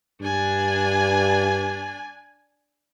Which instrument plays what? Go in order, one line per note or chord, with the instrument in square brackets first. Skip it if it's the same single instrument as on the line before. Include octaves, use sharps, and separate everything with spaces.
[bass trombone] G2 [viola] D4 G#5